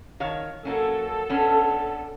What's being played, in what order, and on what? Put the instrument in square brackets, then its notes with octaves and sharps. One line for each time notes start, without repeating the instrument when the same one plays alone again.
[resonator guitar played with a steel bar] D#3 C#5 F5
[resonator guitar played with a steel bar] F#3 A#3 C#4 [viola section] A4
[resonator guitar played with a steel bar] B3 C#4 D4